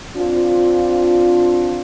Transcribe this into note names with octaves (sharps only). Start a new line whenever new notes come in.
C4 D4 F4